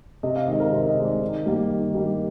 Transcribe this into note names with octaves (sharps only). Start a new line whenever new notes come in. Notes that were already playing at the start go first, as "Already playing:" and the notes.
C3 D#5
F5
D#3 G#3 D#5
A#4
C3 C5
D#5
D#3 G#3
D5
D#3
G3 A#3
D#3
G3 A#3